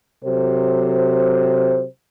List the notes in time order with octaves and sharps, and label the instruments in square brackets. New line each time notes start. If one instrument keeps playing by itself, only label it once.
[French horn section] C3 F#3 A4 C5